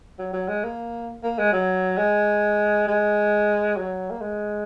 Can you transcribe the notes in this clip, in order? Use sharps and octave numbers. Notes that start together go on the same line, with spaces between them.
F#3
F#3
G#3
A#3
A#3
G#3
F#3
G#3
G#3
F#3
A#3
G#3